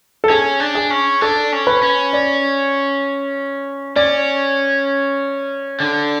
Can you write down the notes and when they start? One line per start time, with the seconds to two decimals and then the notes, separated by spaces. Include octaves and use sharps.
0.24 A4
0.30 C#4 G#4
0.60 D4
0.75 G#4
0.90 C#4
1.21 D4 A4
1.52 C#4
1.67 B4
1.82 C#4
2.13 D5
3.96 C#4 D5
5.80 D3